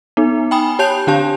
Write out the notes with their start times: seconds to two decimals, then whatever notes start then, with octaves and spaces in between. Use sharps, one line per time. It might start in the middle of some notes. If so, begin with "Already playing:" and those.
0.17 B3 D#4
0.51 G5 G#5 B5 D#6
0.79 G4 C#5 A5 G6 F7
1.07 D3 D4 G4 F5 A5